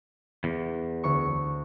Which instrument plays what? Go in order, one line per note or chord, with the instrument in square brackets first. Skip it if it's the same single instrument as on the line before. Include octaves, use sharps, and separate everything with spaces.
[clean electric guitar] E2
[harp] D2 C#6